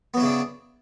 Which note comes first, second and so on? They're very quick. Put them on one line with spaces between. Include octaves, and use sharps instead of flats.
B3 F#3 E4 C#3 D4